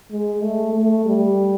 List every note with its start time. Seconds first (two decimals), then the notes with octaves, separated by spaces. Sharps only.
0.11 G#3
0.42 A3
0.73 A3
1.05 G3